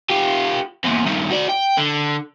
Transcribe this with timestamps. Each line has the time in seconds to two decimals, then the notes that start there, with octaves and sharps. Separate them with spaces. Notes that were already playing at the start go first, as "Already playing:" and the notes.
0.10 F4 G4
0.84 E2 A#2
1.06 G2 D#3
1.31 F#4 D5
1.49 G5
1.78 D3